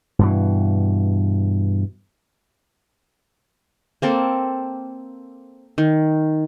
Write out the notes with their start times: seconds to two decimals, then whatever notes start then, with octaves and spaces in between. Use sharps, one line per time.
0.19 G2 B2 E3
4.02 A#3 C4 A4
5.78 D#3